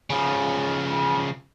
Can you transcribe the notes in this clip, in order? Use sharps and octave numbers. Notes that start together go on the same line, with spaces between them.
C#3 F3